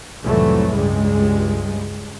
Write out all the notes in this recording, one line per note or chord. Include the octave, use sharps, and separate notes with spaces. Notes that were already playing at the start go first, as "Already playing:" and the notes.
C2 F2 A2 E3 F#3 A3
C#2 G2 G3 G#3